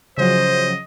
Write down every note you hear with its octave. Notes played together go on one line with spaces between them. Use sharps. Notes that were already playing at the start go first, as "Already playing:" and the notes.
C#3 F3 F#3 C5 D#5